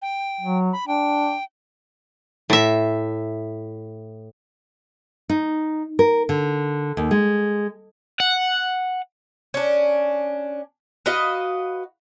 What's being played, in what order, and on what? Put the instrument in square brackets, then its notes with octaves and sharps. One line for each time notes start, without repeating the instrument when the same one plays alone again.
[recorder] G5
[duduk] F#3
[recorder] B5
[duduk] D4 [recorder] G5
[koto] A2 E5
[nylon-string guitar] D#4
A#4
D3
D#2
G#3
[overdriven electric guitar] F#5
[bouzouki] C#4 D4
F#4 B4 D#5 F5